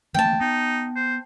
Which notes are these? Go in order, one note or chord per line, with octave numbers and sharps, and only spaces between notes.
E3 A3 A#3 G5 A5
B3 D#4
C5